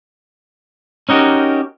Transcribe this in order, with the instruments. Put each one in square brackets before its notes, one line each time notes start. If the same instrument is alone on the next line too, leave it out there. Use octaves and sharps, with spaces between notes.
[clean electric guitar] C#4 D#4 F#4 G4 A#4